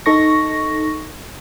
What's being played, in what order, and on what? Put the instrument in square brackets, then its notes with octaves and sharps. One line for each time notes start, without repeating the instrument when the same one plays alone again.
[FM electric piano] D#4 A4 C#6 A#6